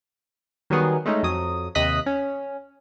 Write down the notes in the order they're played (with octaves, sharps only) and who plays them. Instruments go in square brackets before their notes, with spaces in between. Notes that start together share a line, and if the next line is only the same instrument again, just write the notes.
[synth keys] D#3 F#3 G3 B3 G#4
G#3 A3 C#4 D#4
F2 F#3 D#6
D#2 C3 D#5 D#6 F#6 B6
C#4